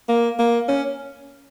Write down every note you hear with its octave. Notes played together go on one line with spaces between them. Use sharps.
A#3
A#3
C#4